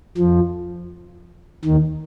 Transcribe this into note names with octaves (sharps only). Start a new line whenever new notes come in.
F2 F3
D#2 D#3